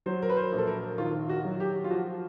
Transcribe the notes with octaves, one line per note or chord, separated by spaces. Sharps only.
F#3 C5
A#4
B4
C5
A#1
A4
A#4
D#3 F4
F#4
F#3
G4
F4
F3 F#4